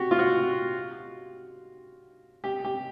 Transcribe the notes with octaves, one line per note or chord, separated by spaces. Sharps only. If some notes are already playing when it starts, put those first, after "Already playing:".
Already playing: F#4 G4
F4
F#4
G4
G4